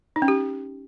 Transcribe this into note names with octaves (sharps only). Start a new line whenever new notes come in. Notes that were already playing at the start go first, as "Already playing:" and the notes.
D#4
C#4
G4